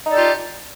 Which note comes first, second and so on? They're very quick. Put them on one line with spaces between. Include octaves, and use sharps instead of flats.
D#4 D5 A4 G4 F4